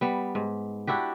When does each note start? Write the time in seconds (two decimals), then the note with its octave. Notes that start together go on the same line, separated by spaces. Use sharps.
0.01 G3 B3
0.35 G#2
0.87 D4 E4 F#4 G4